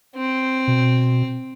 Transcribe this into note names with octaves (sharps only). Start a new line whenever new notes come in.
C4
B2